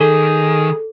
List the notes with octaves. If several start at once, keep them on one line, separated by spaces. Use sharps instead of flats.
D#3 G#4 A4